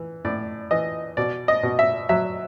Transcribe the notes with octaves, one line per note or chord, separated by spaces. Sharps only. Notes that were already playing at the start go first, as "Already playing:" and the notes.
Already playing: E3
A2 D5
E3 D#5
B2 D5
D#5
B2
E5
F#3 E5